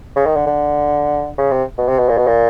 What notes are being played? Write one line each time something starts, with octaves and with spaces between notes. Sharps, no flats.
C#3
D#3
D3
D3
C#3
C3
B2
C3
B2
A#2
B2
A#2